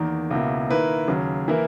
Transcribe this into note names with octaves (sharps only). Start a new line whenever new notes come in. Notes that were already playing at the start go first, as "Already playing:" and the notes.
Already playing: E2 D#3 A#3
C#2 B2 A#3 E4
D#3 A#3 E4 B4
D#2 C#3 F#3
E3 A#3 E4 A#4